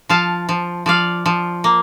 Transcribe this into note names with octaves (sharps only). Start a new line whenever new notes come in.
F3 F5 A5
F3
F3 D5 F5
F3
A#3